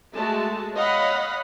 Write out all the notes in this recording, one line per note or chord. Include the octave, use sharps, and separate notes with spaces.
G#3 A3 F#4 A5
C#5 D#5 F5 F#5 B5